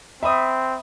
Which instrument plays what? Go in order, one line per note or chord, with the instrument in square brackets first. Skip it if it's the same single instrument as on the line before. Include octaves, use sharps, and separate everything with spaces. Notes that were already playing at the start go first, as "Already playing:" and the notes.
[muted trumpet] C4 [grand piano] E5 B5 D#6